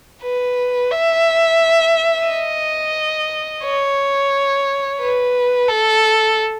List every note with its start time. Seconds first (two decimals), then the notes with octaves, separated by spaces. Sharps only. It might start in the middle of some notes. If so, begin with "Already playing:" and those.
0.23 B4
0.91 E5
2.28 D#5
3.64 C#5
5.01 B4
5.68 A4